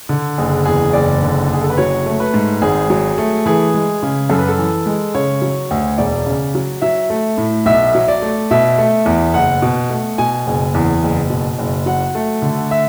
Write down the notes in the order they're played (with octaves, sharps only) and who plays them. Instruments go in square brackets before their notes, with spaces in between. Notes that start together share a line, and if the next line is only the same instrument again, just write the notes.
[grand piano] D3
F#1 G#4
E2 G#4
F#1 D5
D3
F#1 G#4
A4
B4
F#3 C#5
A3
B4
G#2
G#1 G#4
F#3
A3
E3 G#4
G#3
C#3
F#2 A4
B4
A4
E3
G#3
C#3 C#5
F#3
D2
E1 D5
C#3
F#3
F#3 E5
A3
A2
B1 E5
F#3
D5
A3
B2 E5
A3
E2
F#1 F#5
B2
A3
B2 G#5
F#1
E2
F#1
B2
F#1
F#3 F#5
A3
D3
E5